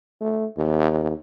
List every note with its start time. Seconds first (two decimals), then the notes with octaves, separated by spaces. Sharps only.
0.21 A3
0.57 D#2